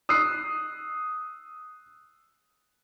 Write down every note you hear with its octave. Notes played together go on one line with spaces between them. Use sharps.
D#6 E6 F#6 C7